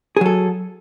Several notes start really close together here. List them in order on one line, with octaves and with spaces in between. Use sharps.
G#4 F#3 A4